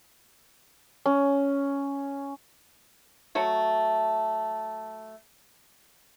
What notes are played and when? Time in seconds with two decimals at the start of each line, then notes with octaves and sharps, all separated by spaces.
1.06 C#4
3.35 F#3 A3 C#5